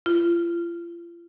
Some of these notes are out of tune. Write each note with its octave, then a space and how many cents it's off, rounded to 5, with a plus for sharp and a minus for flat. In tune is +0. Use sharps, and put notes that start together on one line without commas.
F4 -40